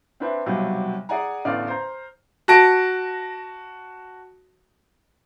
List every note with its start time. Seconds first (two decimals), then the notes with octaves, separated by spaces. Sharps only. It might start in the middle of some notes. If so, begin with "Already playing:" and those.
0.20 C4 D4 B4 E5
0.46 B1 C3 F#3 G3
1.09 G#4 D5 F#5 G#5 A#5
1.45 A1 E2 D3 D5 F5 F6
1.68 C5 A#5
2.48 F#4 A5 A#6 D7